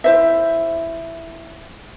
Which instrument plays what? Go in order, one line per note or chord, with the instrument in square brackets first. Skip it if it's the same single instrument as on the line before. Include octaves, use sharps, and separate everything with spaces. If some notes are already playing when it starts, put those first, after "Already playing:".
[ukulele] E4 C5 E5